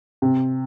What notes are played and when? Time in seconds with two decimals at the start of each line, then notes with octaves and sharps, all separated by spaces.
0.22 C3